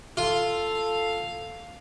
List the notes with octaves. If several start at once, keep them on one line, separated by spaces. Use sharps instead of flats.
F4 A4 F5